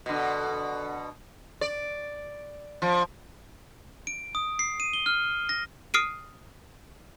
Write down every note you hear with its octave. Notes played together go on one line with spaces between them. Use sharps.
B2 D3
D5
F3
D7
D#6
C7
D#7
G7
F6
A#6
D#6 F6 C7 D7 D#7